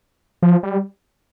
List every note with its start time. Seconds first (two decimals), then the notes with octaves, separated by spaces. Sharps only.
0.43 F3
0.63 G3